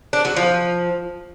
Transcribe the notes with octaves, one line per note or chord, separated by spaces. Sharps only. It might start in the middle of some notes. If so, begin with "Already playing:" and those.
D4
F#3
F3